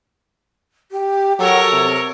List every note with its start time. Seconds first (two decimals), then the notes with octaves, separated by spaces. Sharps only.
0.92 G4
1.39 F#3 A4 A#4 C#5
1.72 C3